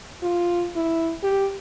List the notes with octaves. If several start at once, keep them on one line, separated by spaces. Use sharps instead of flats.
F4
E4
G4